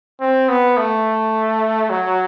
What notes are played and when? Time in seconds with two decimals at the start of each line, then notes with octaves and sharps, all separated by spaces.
0.21 C4
0.48 B3
0.77 A3
1.90 F#3